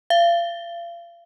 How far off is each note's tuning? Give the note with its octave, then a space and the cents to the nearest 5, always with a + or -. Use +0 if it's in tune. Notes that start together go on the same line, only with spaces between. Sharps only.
F5 -35